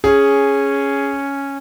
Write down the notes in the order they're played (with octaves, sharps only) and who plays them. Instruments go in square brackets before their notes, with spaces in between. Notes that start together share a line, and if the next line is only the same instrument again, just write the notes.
[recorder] C#4 [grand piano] G#4